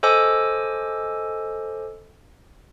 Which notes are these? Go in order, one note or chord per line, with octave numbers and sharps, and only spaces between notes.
A4 C5 D#5 G#5 D6 E6